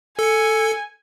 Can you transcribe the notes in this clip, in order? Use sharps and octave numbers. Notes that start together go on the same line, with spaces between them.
A4 G#5 C#7